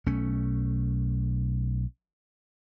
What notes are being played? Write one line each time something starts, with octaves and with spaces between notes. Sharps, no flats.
B1 A3 C#4